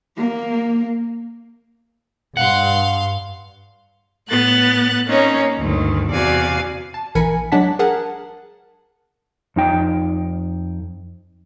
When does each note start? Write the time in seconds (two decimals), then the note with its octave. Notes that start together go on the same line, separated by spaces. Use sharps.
0.17 A#3
2.37 G2 F5 F#5 C6
4.29 A2 B3 F#6 A6
5.05 A#3 C4 C#4 D#4 C#5
5.56 D2 G2 D#3
6.09 E2 C3 F#4 D5 F5 G#5
6.94 A5
7.15 A#1 E3 A#4 G#5 B5 C#7
7.52 F#3 G#3 D4 F#5 A5 B6
7.79 G#4 A#4 F#5 A5
9.56 F2 D#4 G5